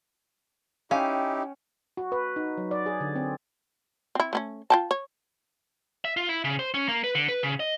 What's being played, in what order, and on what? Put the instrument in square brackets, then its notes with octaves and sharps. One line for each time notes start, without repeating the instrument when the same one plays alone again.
[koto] C#4 [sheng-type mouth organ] D#4 E4 G4 [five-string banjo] F5 [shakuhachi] G5
[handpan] F#4
B4
D#4
F#3
D5
G#4
D3
C4
[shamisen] C4 E4
A3 B3 C#4
F4 G5 A5
C#5
[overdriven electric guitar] E5
F4
E4
C#3
C5
C#4
A#3
B4
D3
B4
C#3
D#5